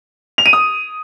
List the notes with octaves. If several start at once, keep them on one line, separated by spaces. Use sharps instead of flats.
F7
D#7
D#6